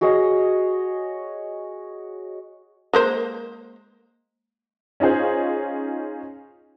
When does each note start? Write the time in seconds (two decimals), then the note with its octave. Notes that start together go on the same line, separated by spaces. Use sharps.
0.01 F#4 G#4 C#5 D#5
2.93 G#3 A#3 C5
5.00 C#4 D#4 F4 G#4 C5